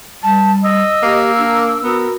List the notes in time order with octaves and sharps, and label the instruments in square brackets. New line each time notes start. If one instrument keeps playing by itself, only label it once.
[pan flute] G3 [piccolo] A5
[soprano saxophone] D#5 [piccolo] E6
[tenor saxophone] A#3 [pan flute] G4
[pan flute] D4 [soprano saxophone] A#4
[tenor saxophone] B3 [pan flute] F#4 [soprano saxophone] A#4